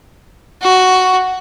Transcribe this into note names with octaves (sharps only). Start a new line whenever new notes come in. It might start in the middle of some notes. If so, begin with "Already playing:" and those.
F#4